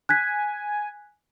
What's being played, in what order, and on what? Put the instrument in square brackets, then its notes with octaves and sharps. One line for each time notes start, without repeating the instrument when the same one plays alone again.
[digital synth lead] G#5 [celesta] F#6 G#6 B6